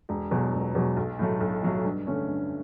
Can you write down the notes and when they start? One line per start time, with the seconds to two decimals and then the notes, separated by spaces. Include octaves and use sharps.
0.09 E1
0.31 E2 B2 F#3
0.53 E1
0.75 E2 B2 F#3
0.97 B1
1.19 A2 F#3 A3
1.40 B1
1.62 A2 F#3 A3
1.85 G2
2.07 D3 A3 C#4
2.29 G2